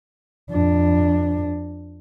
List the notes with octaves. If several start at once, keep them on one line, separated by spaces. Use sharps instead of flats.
F2 D4